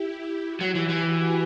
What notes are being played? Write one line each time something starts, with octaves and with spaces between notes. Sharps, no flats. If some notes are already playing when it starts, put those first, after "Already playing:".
Already playing: E4 G4
F#4
F#3
E3 G4
E3
F#4